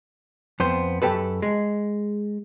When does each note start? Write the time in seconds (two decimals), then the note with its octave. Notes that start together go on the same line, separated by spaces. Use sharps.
0.60 F2 B3 C5
1.02 F#2 G4 A4 B4
1.42 G#3